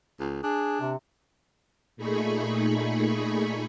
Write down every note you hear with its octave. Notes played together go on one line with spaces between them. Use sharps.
C#2
D4 G#4
C3
A#2 A3 D#4 G#4 B5 C#6